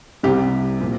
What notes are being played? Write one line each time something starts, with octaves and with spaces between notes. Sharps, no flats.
C2 C3 G3 G4
A#2 F3